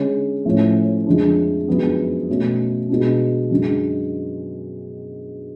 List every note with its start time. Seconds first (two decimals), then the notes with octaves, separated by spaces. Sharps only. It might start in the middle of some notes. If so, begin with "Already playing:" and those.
Already playing: D3 G#3 C#4
0.45 A2 F3 A3 C#4
1.06 F2 D3 G#3 D4
1.68 F#2 F3 G#3 B3 D4
2.29 B2 A3 C#4
2.89 B2 G#3 D4
3.51 F#2 D3 G#3